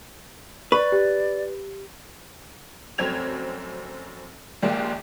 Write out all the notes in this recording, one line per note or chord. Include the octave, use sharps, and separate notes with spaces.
B4 D5 C#6
G4
F1 F#2 C4 G#6 F7
A#1 D#2 G#3 A#3